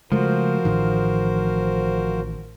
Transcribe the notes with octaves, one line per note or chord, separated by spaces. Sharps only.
C#3 F3 G#3 A3 F#4 A#4 C5
A1 A2 D#3